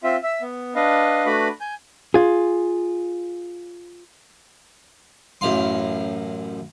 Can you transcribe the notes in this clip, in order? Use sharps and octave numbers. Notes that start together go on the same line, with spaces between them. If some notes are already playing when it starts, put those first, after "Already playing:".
C4 F4 E5
E5 E6
B3
D4 B4 D#5 F5
A3 D4 F#4 B4 B5 D6
G#5 G6
F4 G#4
A1 F#2 E4 F5 C6